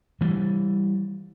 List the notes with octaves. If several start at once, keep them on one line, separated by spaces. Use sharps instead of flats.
E3 G3